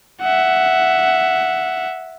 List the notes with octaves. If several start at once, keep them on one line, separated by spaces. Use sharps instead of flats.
E5 F#5